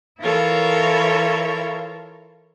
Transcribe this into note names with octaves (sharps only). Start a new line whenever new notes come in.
E3 E4 F4 A4 A#4 C#5